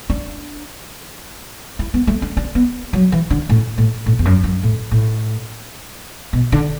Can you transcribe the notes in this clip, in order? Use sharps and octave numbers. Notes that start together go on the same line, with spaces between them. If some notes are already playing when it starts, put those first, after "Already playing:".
D4
E4
B3
A3
D4
D4
B3
F#3
E3
D3
A2
A2
A2
E2
F#2
F#2
A2
A2
B2
D3